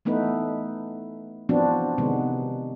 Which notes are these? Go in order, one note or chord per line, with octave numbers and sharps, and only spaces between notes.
E3 A3 B3 D#4 B4
E3 F3 B3 C4 D4 F#4
C3 D#3 G#3 B3